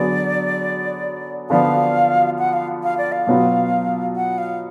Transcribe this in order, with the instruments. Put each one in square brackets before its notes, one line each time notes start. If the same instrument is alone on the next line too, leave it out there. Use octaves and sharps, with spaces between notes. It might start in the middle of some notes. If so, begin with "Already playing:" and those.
Already playing: [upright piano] D3 F#3 B3 D4 G#4 [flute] D5
[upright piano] D3 F3 B3 D4 [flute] F5
[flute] F#5
F5
F5
D5
F5
[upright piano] B2 F#3 B3 F4
[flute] F#5
F5